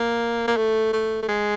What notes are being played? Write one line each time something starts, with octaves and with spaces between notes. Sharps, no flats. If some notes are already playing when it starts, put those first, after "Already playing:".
Already playing: A#3
A#3
A3
A3
A3
G#3